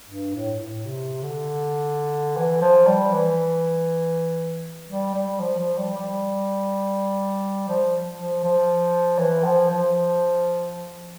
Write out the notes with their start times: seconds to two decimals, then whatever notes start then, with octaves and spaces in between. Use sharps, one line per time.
0.08 G2
0.35 A2
0.59 A2
0.85 C3
1.23 D3
2.37 E3
2.61 F3
2.87 G3
3.12 E3
4.89 G3
5.14 G3
5.40 F3
5.58 F3
5.78 G3
5.97 G3
7.68 F3
8.18 F3
8.44 F3
9.19 E3
9.44 F3
9.70 F3